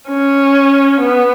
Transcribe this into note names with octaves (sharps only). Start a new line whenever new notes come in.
C#4
B3